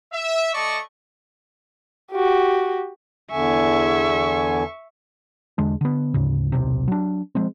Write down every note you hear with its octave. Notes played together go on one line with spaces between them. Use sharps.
E5
A3 D5 D#5 A5 C#6
F#4 G4
E2 D3 E5 G#5 C#6
E2 D3 G#3 D4
D3 B3
D2 G#2 C#3
D#1 B1 C3
F#3 D4
F3 G#3 C4